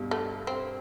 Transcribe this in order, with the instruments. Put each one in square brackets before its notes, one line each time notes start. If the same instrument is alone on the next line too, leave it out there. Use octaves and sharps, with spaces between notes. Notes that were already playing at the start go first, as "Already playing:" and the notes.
Already playing: [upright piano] G2 B2
[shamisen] A3
C4